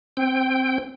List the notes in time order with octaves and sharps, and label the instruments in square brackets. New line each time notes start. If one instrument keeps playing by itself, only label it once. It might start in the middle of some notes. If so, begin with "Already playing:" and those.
[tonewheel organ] C4 G5